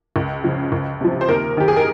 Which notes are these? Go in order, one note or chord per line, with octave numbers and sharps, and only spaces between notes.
C#2
C#3 F3
C#2
C3 F3
C5
D#2 A#4
D#3 G4
G#4
A#4